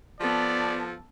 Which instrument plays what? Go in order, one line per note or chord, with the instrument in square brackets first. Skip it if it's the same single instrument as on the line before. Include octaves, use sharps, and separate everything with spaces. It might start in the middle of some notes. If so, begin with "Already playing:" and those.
[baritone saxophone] F3 [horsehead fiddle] B3 A4 [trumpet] D5